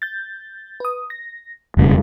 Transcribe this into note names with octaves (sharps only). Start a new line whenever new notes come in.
G6 A6
B4 D#6
A#6
E1 F2 C#3 G3 G#3